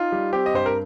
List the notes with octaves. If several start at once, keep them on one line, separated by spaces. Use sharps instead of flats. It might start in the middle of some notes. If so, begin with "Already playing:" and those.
Already playing: D#4 F4
G3
C4 G4
D#5
G2 C5
A#4